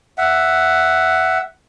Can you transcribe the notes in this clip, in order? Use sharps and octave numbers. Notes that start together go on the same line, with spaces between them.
E5 F#5